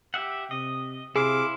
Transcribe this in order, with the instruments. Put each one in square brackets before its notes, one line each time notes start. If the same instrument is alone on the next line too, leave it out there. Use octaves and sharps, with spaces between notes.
[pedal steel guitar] G4 E5 F#5
[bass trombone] C3 [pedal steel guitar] D#5
[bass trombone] C3 [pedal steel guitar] E4 C5 F5 [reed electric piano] G#4 [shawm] D6